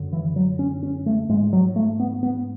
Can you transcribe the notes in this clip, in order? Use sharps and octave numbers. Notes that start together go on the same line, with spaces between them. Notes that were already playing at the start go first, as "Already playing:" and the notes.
Already playing: F#2 D3
E3
F#3
C#4
C#4
A3
G#2 G#3
F#3
A3
B3
B3